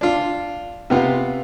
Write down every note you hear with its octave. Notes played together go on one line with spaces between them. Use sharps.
D4 F4
C3 B3 F4